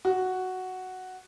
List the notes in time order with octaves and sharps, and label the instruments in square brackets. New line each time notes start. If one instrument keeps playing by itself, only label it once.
[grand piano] F#4